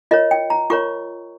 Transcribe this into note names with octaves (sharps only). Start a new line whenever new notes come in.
F4 A#4 C#5 D#5
G5
A#5
F4 A#4 C#5 C#6